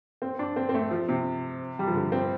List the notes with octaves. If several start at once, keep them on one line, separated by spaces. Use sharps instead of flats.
C4
D4
C4
C4
A3
F3
C3
G3
F3
D3
C4